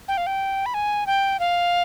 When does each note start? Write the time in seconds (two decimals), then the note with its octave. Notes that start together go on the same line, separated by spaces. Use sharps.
0.08 G5
0.17 F5
0.27 G5
0.66 B5
0.74 G#5
1.07 G5
1.40 F5